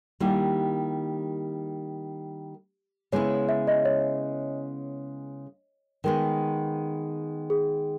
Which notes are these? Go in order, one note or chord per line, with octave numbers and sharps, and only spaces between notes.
D#3 G3 A#3 E4 G4
C#3 G#3 B3 E4 C#5
E5
D#5
C#5
D#3 G#3 B3 A#4
G#4